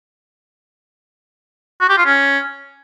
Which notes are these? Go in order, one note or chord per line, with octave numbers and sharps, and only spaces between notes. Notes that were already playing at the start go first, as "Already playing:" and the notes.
F#4
G4
F4
C#4